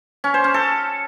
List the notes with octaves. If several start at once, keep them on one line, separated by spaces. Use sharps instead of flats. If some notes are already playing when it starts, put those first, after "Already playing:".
C#4
C5
C#4
A4